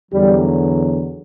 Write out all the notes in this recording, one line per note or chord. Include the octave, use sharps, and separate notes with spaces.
E2 D3 F#3 G3